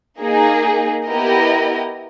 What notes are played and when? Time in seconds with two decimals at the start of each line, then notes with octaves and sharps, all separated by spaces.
0.21 A#3 D#4 G#4
1.07 B3 E4 G4 A#4 D#5